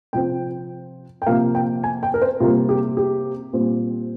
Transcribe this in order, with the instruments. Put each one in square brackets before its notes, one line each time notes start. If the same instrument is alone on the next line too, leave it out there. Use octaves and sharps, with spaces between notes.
[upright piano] C3 F3 C4 G5
G5
C3 F3 A#3 F5
G5
G#5
G5
A#4
C5
C3 G3 A#3 F4
G4
G4
A#2 G3 C4